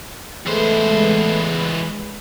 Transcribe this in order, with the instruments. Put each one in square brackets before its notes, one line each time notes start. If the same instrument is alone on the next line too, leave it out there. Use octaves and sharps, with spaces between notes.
[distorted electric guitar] E2 C5 [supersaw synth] G#3 B4 [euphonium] A3